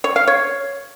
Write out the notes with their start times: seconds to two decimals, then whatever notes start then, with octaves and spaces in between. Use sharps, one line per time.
0.04 C#5
0.16 F5
0.28 C#5